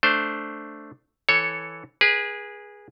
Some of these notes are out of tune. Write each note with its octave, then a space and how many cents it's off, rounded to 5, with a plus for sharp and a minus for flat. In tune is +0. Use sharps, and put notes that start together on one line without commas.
A3 +0 D4 +0 C5 +0
E3 +0 A4 +5 C#5 +0
G#4 -10 B4 -35